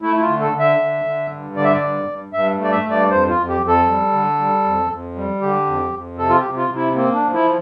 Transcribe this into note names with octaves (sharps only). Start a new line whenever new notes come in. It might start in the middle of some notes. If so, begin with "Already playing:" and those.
A3 E4
E4
F4
D3
A4
D3
E5
D3
D3
G2
D3 D5
E5
D5
G2
G2
G2 E5
A3
D5
E5
G2
D5
F2 C5
F4
F2
G4
F2
A4
G3
D3
G3
F2
F2
G3
D3 G4
F2
F2
C3 A4
F4
G4
C3
F4
C3
E4
A#3 C4
D4
F3
E4